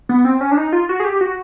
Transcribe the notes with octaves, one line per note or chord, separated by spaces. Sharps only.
B3
C4
C#4
D4
D#4
F4
F#4
G#4
G4
F#4